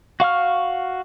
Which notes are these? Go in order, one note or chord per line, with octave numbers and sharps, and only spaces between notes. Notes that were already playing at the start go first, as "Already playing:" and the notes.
F#4 F5 C#6 F6